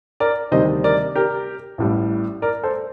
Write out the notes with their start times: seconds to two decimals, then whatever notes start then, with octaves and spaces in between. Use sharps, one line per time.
0.20 A#4 D5
0.51 D2 C3 D#3 G3 C5 D#5
0.84 A#4 D5
1.15 G4 A#4
1.78 A1 A2 G3
2.42 A#4 D5
2.63 A4 C5